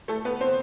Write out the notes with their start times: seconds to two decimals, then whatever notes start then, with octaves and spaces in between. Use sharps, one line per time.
0.08 A3 A4
0.25 B3 B4
0.41 C4 C5